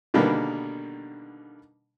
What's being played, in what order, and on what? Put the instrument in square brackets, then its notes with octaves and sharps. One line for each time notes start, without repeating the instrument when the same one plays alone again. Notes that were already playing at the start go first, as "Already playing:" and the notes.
[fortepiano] B2 D3 D#3 G3 A#3 B3